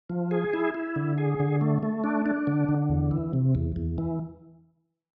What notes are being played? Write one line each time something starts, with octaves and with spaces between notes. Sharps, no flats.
F3
G#4
E4
E4
D3
G#4
D3
A3
A3
D4
D4
D3
D3
E2
E3
C3
E2
E2
E3